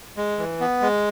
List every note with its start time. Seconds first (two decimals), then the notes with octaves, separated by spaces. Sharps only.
0.17 G#3
0.38 E3
0.60 B3
0.82 G#3